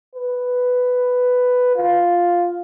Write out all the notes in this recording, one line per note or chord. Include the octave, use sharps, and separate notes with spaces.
B4
F4